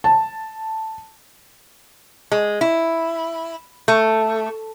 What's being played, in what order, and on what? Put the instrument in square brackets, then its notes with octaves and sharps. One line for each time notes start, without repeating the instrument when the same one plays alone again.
[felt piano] A5
[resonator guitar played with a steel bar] G#3
E4
A3